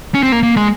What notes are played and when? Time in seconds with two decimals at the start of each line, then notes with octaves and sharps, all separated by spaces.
0.14 C#4
0.23 C4
0.32 A#3
0.43 A#3
0.57 G#3